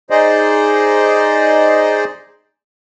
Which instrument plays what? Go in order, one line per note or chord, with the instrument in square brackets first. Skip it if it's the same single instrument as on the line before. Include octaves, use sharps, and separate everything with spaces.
[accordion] D#4 G#4 C5 D5 D#5